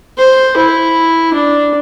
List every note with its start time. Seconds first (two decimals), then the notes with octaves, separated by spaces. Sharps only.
0.18 C5
0.57 E4
1.33 D4